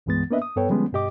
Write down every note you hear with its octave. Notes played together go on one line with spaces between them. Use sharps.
C2 G2 E3 G#3 B3 A6
A#3 B3 D4 B4 D#5 E5
D#6
G2 B3 A4 B4 C#5 G5
D3 F3 G3 G#3 B3 C#4
G2 B2 G4 D#5 D6